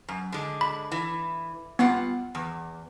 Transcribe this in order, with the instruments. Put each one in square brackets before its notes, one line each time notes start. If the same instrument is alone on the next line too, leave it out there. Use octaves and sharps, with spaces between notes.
[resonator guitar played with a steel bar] F#2
D3 G#3
[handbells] B5
[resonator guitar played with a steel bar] E3
[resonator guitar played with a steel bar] G2 F4 F#5 [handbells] B3
[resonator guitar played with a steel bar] E2